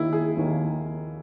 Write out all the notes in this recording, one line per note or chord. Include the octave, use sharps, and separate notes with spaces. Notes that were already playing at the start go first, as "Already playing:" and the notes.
Already playing: D#2 D#3 A#3 E4
G#4
D#2 D#3 A#3